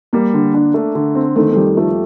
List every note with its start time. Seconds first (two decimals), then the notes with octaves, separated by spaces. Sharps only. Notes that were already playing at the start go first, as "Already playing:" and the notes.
0.13 G3 A#3
0.34 D3
0.54 D4
0.74 A3
0.95 D3
1.15 C4
1.36 D#3 A3
1.51 A3
1.56 F2 G3
1.77 F3 A3